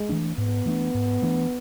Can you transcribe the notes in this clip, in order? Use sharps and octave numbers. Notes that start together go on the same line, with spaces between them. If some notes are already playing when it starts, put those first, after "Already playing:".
Already playing: G#3
E3 A3 D4
G#2 B3
E3 A3 D4
G#2
E3 A3 D4